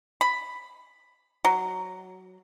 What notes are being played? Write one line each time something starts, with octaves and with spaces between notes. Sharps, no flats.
B5
F#3